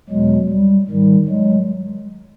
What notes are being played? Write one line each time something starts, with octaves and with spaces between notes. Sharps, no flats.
E2 B2 F#3 G#3
G3
G#2 D#3 G3
F#3 G#3